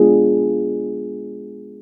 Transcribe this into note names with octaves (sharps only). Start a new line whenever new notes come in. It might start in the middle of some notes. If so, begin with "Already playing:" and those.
Already playing: G#3 B3 D4 F4 G#4